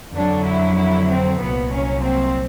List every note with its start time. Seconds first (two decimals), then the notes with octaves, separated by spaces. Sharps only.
0.13 F2 D3 F#3 D4
0.45 E4
0.76 E4
1.08 C4
1.40 C2 A#2 F#3 B3
1.72 C#4
2.03 C4